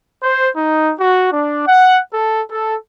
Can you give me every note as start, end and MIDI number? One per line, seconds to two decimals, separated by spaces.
0.23 0.49 72
0.56 0.93 63
1.00 1.29 66
1.33 1.66 62
1.68 2.00 78
2.14 2.42 69
2.51 2.75 69